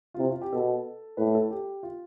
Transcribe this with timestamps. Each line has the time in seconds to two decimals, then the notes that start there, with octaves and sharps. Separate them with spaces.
0.14 F4
0.18 C3 E4
0.30 F4
0.41 G4
0.52 B2 A4
1.17 A2 B4
1.35 A4
1.51 G4
1.83 F4